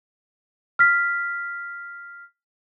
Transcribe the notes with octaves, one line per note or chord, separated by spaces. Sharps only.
F6 B6